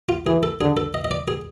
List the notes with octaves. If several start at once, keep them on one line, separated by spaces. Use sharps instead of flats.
F4
E3 G#4
A4
D3 G#4
A4
D#5
D#5
D5
G#4